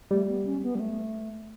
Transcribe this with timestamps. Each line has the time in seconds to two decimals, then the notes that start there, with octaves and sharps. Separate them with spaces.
0.11 G3 A3
0.28 B3
0.45 C#4
0.63 B3
0.75 G3
0.80 A3